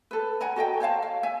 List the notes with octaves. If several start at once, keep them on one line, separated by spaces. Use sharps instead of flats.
A4 B4
F#5 G#5 A#5
F#4 A4 D#5 G5
C5 C#5 F5 A5
F5
E5 G#5